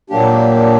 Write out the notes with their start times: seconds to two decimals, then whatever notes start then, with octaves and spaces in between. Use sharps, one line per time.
0.10 A#2 F#3 A#3 D4 G4